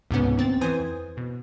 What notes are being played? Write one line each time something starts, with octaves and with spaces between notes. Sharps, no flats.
C#2 G#2 C3 B3 C#4
D#2 C4 A6
F2 E3 C5 G#5 D#6
B2